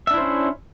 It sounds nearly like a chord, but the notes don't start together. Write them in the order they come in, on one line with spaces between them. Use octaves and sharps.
E5 D4 E4 C5 C#4